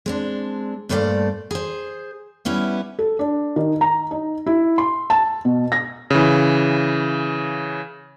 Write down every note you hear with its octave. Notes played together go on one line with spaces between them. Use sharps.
G#3 C4 D4
G2 A#2 A3 C5 D5 F5
G#4 C5
G3 B3 C#4 E4
A4
D4
D#3
A#5
D#4
E4
C6
A5
B2
A#6
C#3 E3